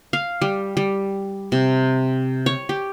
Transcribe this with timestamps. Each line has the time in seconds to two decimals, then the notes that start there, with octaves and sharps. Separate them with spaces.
0.13 F5
0.41 G3
0.77 G3
1.52 C3
2.46 C#5
2.69 G4